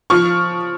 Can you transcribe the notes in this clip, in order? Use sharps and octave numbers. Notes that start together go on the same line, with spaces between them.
F3 C#6 F6